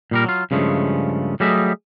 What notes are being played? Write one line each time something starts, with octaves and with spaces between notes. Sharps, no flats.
A#2 G3 A#4
F#3 F4
G2 C#3 F3 G#3 A3
F#3 G3 A3 G#4 D#5 E5